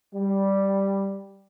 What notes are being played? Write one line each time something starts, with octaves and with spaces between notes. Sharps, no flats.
G3